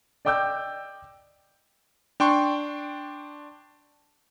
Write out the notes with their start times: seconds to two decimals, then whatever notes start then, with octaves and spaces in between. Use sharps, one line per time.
0.25 D5 D#5 G5 D6 E6 G6
2.20 D4 G5 C6 C#6